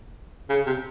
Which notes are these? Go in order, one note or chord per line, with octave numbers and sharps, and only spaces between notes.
C#3
C3